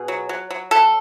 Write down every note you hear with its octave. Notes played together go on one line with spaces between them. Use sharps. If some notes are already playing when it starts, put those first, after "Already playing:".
Already playing: B2 G#4
F#3
F#3
F#3
F#3 A4